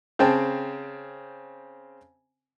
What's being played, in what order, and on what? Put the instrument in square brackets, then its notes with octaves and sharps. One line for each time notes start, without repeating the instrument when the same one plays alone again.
[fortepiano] C#3 C4 G5 A5